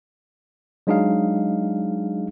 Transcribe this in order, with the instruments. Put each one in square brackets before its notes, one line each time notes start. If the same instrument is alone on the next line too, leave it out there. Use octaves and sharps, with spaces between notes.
[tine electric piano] F#3 G#3 D4 D#4 G#4 F5